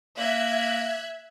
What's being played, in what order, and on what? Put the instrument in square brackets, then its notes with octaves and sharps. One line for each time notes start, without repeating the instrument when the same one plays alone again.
[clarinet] A#3 [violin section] E5 F#6 G#6